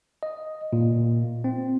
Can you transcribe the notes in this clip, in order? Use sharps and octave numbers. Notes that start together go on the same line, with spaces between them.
D#5
A#2
C4